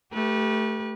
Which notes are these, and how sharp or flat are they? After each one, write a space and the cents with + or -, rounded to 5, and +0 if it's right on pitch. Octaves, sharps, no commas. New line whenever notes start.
A3 +0 G4 +0 B4 -30